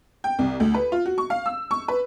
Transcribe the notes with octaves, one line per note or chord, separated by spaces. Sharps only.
G5
C2
D2
B4
F4
F#4
C#6
F5
E6
C#6
B4